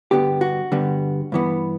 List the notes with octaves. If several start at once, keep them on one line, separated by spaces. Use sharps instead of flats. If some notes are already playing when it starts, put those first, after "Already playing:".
G2 D3 G3 B3 G4
F#4
G2 D3 G3 B3
G2 E3 B3